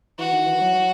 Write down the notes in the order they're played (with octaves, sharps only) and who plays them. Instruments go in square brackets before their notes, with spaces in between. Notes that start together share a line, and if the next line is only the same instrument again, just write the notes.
[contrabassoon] E3 [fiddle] F#4
[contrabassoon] D#3
E3
F#3
F#3